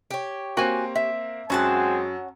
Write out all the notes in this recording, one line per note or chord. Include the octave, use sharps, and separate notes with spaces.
G4 C#5
A#3 C4 F#4 G#5
E5
F#2 G#3 C4 C#4 F#4 G#5 A5